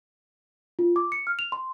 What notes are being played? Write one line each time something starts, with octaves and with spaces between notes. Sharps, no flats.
F4
D6
C#7
F6
F7
C6